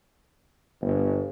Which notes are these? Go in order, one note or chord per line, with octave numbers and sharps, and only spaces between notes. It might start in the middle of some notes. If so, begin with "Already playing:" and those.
G1